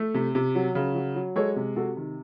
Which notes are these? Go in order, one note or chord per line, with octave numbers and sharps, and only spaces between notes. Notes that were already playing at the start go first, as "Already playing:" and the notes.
Already playing: A3
C3
C3
F#3
C#3
F#3
F#3
G#3 A4 C#5
C3
C3 F#4 A4
D#3